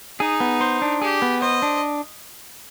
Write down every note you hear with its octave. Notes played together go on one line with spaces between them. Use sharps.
D#4 G#4
B3
C5
D4
G4 G#4
B3
C5 D#5
D4